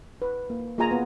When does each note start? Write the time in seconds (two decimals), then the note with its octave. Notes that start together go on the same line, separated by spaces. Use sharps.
0.22 B4
0.50 A#3
0.78 A#3 F4 G#4 A#4 G#5 A#5
0.91 B3